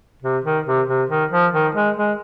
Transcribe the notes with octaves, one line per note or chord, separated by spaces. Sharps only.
C3
D#3
C3
C3
D#3
F3
D#3
G#3
G#3